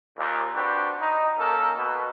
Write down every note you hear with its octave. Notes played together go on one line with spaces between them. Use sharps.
D#2 A#2
C4 D4 F#4 G4 B4
D#4
A#3 C#4 D#4 A4 A#4
B2